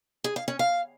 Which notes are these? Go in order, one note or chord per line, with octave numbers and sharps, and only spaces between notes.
G#4
F5
C#4
F5